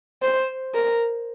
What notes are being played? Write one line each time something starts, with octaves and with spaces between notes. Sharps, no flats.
C5
A#4